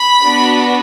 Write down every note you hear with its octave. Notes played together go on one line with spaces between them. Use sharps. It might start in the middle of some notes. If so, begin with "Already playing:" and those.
Already playing: B5
B3 D4 F#4